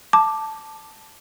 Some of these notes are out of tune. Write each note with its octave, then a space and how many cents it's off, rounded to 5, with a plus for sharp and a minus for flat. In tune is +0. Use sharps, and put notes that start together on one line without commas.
A5 +0 D6 +10